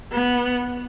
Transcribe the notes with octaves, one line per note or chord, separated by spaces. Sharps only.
B3